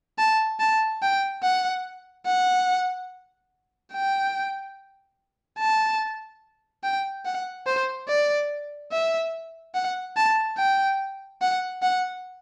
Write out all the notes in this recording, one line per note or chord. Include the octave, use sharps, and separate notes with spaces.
A5
A5
G5
F#5
F#5
G5
A5
G5
F#5
C5
D5
E5
F#5
A5
G5
F#5
F#5